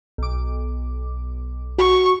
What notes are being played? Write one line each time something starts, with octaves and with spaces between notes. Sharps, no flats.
B1 D6
F#4 C#6